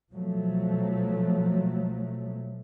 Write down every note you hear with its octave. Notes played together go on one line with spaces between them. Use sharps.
B2 F3 F#3 A3